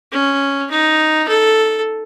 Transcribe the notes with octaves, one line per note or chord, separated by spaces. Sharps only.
C#4
D#4
A4